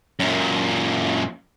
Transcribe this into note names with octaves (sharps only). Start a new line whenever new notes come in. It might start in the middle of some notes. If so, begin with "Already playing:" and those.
F#2 A#2